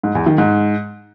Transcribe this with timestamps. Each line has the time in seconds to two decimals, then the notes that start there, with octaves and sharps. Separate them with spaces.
0.03 G#2
0.15 E2
0.26 D#3
0.38 G#2